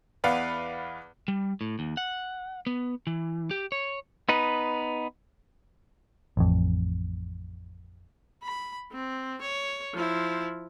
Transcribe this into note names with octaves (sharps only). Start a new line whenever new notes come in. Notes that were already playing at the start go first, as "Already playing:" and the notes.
E2 B4 D5 F5 F#5
G3
A2
D#2
F#5
B3
E3
G4
C#5
B3 D#4 B4
A1 F2
B5
C4
C#5
F3 E4